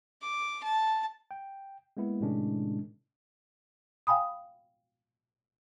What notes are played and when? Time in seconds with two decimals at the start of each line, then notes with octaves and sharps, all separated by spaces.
0.22 D6
0.63 A5
1.31 G5
1.97 G#3 A#3 B3 E4
2.21 A2 C3 D#3 G#3 C#4 D4
4.07 F5 G5 G#5 B5 D#6